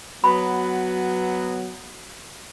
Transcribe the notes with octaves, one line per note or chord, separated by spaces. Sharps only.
F#3 B3 B5